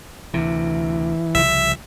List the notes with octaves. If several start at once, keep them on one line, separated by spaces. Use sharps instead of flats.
D2 C3 E3
C2 C#3 F3 E5